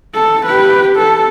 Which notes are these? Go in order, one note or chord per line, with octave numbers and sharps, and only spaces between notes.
A4
G4 B4
A4